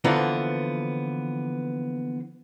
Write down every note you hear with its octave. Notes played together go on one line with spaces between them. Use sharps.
D3 E3 F3 A#3 B3